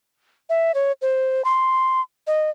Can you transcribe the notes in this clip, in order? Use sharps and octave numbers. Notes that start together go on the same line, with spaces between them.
E5
C#5
C5
C6
D#5